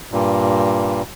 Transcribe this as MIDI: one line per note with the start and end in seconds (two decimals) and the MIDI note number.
0.12 1.02 43
0.12 1.02 46